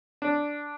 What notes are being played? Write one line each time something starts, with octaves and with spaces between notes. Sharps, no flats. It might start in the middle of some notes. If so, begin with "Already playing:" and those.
D4